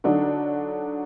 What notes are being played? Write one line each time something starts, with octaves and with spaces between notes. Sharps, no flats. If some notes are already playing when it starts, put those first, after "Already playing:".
D3 F#3 D4 D#4